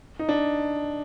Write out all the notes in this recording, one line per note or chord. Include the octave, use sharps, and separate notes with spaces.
D#4
D4